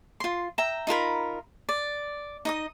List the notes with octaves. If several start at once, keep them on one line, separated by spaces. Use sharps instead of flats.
F4 C6
E5 G5 A#5
D#4 F4 A#4 B5
D5
D#4 D#5 D#6